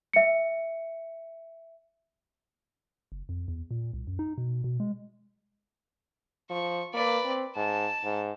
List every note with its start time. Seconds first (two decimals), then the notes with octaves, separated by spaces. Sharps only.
0.13 E5 C#7
3.12 F#1
3.29 F2
3.48 E2
3.71 A#2
3.93 C2
4.07 F#2
4.19 D#4
4.38 B2
4.64 B2
4.80 G#3
6.50 F3 C#6
6.94 A#3 B4 D5
7.25 C4
7.56 G#2 A5
8.04 G#2